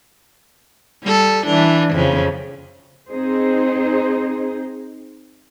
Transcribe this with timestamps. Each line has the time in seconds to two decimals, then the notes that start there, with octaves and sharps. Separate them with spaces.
1.03 G3 A4
1.46 E3 D4
1.94 F2 C#3
3.09 C4 D#4 G#4 C5